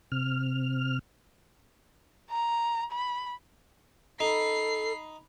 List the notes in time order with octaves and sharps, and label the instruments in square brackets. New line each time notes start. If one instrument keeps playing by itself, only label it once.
[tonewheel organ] C3 F6
[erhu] A#5
B5
[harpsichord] D#4 [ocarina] A4 [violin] B5 C7